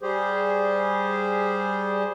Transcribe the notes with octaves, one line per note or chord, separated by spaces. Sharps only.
G3 G4 G#4 C5